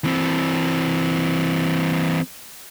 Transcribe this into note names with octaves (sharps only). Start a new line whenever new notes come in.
E3 C4